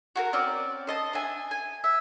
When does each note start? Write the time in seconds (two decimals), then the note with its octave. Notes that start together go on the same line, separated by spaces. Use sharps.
0.16 F#4 G#4 A#4
0.33 C4 C#4 D5
0.87 C5 D#5 A5
1.13 D4 E5 G#5
1.51 G#5
1.84 E5